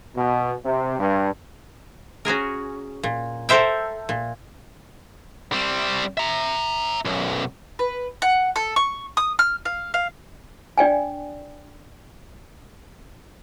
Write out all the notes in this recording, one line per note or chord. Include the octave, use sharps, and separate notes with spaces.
B2
C3
G2
C#4 F#4 G#4 A#4
A#2
A4 A#4 C5 E5 G5
A#2
G3 C4
E5 A#5
B1 F#2
B4
F#5
A4
C#6
D#6
F6
F5
F5
D4 D5 G5 G#5